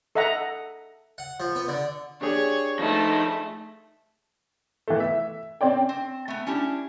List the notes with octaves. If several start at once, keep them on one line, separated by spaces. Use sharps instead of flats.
A4 D#5 E5 F#5 A#5
F#5
F3
B3
D3
D4 G4 G#4 C#5
F3 A3 D#4
E3 A3
E5
C4 C#4 D5 G5
C4
A3 B3
C#4 D4 E4 G4